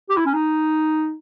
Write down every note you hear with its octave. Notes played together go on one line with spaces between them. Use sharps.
G4
E4
C#4
D#4